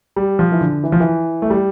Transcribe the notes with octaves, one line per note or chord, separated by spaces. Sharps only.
G3
F3
E3
D3
E3
F3
E3
A3
G3